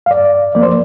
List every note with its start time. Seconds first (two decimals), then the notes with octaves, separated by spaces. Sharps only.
0.06 F5
0.10 G2 D5
0.55 F3 A#3 D5
0.63 C5